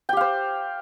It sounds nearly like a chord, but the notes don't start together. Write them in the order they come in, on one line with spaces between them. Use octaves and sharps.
G5 G4 F5 C5